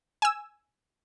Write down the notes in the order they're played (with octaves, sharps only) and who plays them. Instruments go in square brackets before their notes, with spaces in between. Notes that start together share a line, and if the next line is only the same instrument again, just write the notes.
[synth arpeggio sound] G#5 E6